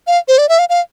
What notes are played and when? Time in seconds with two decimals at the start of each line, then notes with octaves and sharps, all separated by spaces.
0.07 F5
0.28 C5
0.38 D5
0.49 E5
0.59 F5
0.69 F5